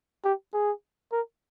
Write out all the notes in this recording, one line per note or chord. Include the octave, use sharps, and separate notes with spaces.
G4
G#4
A#4